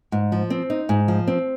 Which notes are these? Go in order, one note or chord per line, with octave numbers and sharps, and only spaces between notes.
G#2
F3
C4
D#4
G#2
F3
C4